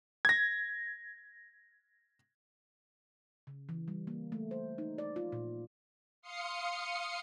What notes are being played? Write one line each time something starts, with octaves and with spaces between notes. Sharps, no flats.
G#6 A#6
C#3
E3
G3
A#3
A3
C5
D#4
D5
F4
A#2
F5 C6 D#6 C7 C#7